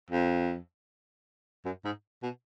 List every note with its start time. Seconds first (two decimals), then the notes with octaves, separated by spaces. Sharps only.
0.11 F2
1.65 F#2
1.84 G#2
2.23 B2